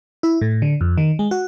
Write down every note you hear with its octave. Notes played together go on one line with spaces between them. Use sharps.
E4
A2
D3
F2
D#3
G#3
F#4